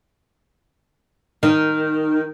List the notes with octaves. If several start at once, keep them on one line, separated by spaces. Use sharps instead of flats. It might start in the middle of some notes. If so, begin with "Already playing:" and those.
D#3